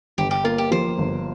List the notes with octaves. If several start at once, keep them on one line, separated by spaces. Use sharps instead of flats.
G1 G4
G4
A#3 F4
G4
F3 C5
G1